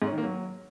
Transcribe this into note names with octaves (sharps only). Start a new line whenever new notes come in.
G#2
C#4
D#3
A#3
F#3